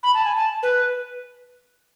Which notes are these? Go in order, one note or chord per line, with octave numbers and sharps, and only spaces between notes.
B5
A5
G#5
A5
B4